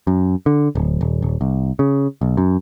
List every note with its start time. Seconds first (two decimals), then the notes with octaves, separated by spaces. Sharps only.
0.07 F#2
0.46 D3
0.75 D1
1.01 D#1
1.22 D#1
1.41 C2
1.79 C#3
2.21 B1
2.37 F#2